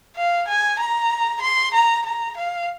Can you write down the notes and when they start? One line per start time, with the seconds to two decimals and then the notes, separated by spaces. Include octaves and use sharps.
0.16 F5
0.48 G#5
0.79 A#5
1.42 C6
1.74 A#5
2.06 A#5
2.37 F5